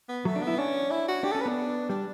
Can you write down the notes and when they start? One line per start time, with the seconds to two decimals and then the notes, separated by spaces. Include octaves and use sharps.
0.09 B3
0.25 F#3 A3
0.36 D4
0.41 B3
0.47 E4
0.59 C#4 D4
0.91 E4
1.08 F#4
1.24 D4 G4
1.31 C#4 A4
1.41 B4
1.46 B3 D4
1.89 G3 D4